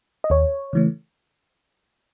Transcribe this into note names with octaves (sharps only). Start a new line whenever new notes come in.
D#5
D#2 C#5
C#3 E3 A3